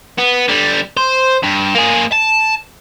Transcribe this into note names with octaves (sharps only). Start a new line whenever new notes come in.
B3
D3 G3
C5
G2
A#3 G#4
A5